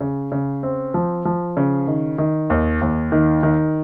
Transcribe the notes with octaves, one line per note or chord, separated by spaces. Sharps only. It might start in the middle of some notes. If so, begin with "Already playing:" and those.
C#3
C#3
C4
F3
F3
C#3
D#3
D#3
D#2
D#2
D#3
D#3